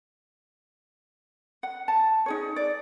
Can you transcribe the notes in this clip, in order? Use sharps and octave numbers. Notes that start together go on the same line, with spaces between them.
F#5
A5
D#4 G#4 C#5
D5